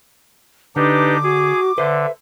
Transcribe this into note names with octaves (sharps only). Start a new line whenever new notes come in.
D3 D4 D#4 G4 B4 D6
F#4 G#4
D3 B4 C5 E5